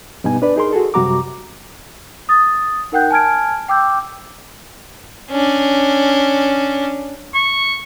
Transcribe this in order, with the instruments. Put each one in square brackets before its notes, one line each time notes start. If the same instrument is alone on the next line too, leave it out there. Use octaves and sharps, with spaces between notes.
[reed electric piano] G2 B2 G3 B3 D#4 G#5
D4 B4 D5
D#4 G#4 A#4 C6
F#4 G#4 A4
F#2 C3 G3 F#4 A#5 D6
[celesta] D#6 A6
D#4 A#4 F#5 G5 F#6 G6
G#5 A5 F6 G#6 D7
G5 D6 E6 G6
[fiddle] C#4 D4
[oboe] C#6